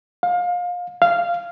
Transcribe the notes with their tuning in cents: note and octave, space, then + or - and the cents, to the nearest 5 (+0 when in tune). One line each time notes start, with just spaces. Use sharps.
F5 +30
F5 -10